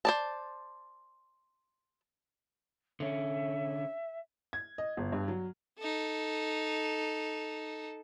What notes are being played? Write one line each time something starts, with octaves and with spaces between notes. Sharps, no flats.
C5 D5 A5
D3 C#4 E5
G#6
D#5
G1
G2
F#3
D#4 A4